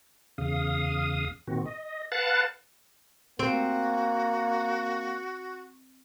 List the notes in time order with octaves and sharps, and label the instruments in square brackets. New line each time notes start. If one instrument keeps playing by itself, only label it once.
[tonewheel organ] E2 C#3 F5 D#6
A#2 D#3 C4 F#4
D#5
B4 F5 F#5 A5 F#6 A6
[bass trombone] A#3 [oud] C4 [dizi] F#4